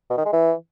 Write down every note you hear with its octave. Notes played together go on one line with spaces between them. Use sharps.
B2
D#3
G#3
E3